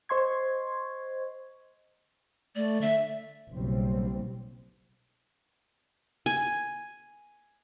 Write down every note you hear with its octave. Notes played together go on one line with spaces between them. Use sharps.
C5 D#5 C6 C#6 G#6
A3 D5
D3 E5
F#1 B1 G3 C4
G#5